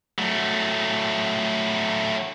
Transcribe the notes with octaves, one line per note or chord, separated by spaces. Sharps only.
F#3 A3